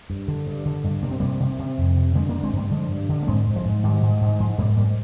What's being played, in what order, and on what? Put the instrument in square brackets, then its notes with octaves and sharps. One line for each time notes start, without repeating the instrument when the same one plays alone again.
[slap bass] G2
D3
G2
D3
G2
C3 A#3
C4
C3 G3 A#3
C3
C3
F2
C3
D3 G#3 C4
A#3 D4
G2
G#3 C4
G2 G3 A#3
D3 F3 G#3
G2
D3
A#3
G#2 G#3 C4
G#2
F3 G#3
G#2
G#2 D#3 G3
G#2
G#2
G#2 F3 G#3
G#2 G3 A#3
G#2 G3 A#3